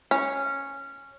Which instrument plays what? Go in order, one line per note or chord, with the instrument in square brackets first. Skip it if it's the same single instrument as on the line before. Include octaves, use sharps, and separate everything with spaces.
[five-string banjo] C#4